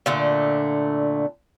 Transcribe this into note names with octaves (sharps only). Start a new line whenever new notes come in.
A#2 D3 A3